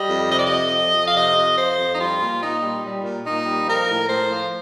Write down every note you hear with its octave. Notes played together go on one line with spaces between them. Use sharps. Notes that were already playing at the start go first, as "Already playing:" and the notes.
Already playing: G3 D#5
F2
C3 D#5
D5
D#5
F2
F3
F2
F5
C3 D#5
F2
F3 C5
F2
D#4
G3 F4
A#2
A#2 D#4
G3
G3
A#2
A#2 D#4
G3
F3 A#4
A2
A2 C5
F3